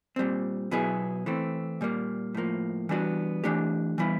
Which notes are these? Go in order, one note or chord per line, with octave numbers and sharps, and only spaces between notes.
A#2 G3 C4
B2 F#3 B3 E4 G#4
E3 A3 C4
A#2 G3 A#3
A2 F3 A#3
E3 G3 B3 D4 F#4
E3 A3 D4 G4
E3 G3 B3 E4